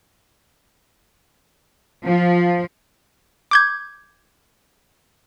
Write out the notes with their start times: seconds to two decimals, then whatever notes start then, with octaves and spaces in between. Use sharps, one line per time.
2.05 F3
3.51 D6 G6 G#6